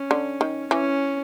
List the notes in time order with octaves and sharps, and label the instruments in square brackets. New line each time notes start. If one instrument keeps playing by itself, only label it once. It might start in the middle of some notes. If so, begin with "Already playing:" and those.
Already playing: [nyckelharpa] C#4
[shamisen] D3
D#3
[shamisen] E3 [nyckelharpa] C#4